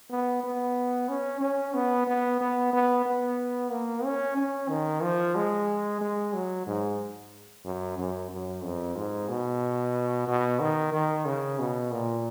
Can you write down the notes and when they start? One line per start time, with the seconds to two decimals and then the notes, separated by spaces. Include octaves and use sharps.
0.11 B3
0.44 B3
1.09 C#4
1.41 C#4
1.74 B3
2.07 B3
2.41 B3
2.73 B3
3.06 B3
3.71 A#3
4.04 C#4
4.37 C#4
4.69 D#3
5.02 F3
5.36 G#3
6.01 G#3
6.34 F#3
6.67 G#2
7.65 F#2
7.98 F#2
8.31 F#2
8.64 F2
8.96 G#2
9.29 B2
10.28 B2
10.60 D#3
10.93 D#3
11.25 C#3
11.59 B2
11.92 A#2